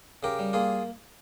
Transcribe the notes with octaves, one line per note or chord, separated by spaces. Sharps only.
C#3 G4 A#4
G3
A#3 F4 G#4